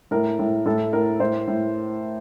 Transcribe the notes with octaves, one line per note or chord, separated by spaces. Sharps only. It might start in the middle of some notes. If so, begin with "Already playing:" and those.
A2 A#4
A2
A2 A4
A2 A#4
A2 C5
A2